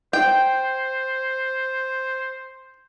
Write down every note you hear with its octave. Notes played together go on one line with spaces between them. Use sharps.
C5 G5